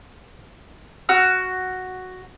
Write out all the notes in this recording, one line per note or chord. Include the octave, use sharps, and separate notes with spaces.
F#4 F6